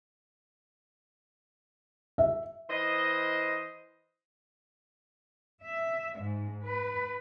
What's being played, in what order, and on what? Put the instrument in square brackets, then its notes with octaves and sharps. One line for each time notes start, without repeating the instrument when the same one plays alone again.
[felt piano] E5
[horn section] E3 C5 D#5
[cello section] E5
G#2
B4